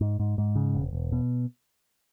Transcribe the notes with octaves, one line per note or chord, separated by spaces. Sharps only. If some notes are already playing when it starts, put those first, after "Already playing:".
G#2
G#2
G#2
C#3
E1
E1
B2